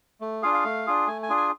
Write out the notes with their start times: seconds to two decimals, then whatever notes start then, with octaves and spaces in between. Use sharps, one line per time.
0.21 A3
0.43 D4 F4 G#4 F5
0.54 F5
0.65 A3
0.87 D4 F4 G#4
1.07 A3 G#5
1.23 G#5
1.30 D4 F4 G#4
1.37 G#5